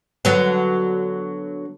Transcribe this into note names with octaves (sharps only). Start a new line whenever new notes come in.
D3 F#3 B3